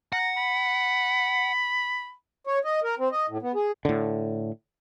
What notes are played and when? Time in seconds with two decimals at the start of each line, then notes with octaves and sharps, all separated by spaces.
0.13 F#5 A#5
0.37 B5
2.47 C#5
2.65 D#5
2.84 A#4
2.99 C4
3.12 D#5
3.29 A2
3.42 B3
3.55 G#4
3.85 A2 D3